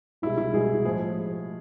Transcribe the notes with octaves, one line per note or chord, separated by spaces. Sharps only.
C2 B2 G#3 E4
E4
C2 B2 G#3 G#4
A2 F3 G#3 G#4